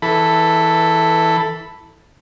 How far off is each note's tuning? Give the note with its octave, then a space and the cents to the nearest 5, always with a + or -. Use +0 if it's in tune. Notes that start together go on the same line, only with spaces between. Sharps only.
E3 -10 A4 +5 B5 +0